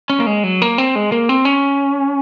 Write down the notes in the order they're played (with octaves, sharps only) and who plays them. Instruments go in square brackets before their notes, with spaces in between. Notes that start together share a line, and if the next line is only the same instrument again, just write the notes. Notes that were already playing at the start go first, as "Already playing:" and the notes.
[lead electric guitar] C#4
A#3
G#3
F#3
A#3
C4
G#3
A#3
C4
C#4